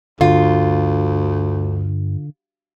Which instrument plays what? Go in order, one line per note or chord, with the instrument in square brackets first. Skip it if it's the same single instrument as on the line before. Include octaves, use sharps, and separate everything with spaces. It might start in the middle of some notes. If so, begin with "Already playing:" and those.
[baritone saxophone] D2 [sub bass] G2 [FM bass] D3 [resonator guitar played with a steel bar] F4